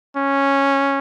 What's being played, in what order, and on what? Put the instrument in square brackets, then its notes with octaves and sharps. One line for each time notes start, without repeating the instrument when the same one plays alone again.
[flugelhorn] C#4